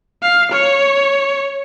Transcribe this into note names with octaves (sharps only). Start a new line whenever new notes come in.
F5
C#5